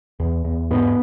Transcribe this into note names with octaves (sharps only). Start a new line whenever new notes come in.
E2
E2
G#2 B3